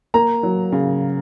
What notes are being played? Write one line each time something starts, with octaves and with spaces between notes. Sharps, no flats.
A#3 A#5
F#3
C#3